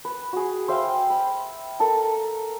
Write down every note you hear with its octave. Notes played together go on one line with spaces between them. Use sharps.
B4
F#4 G#4
C5 E5 F5 G5
B5
A4 A#4 A5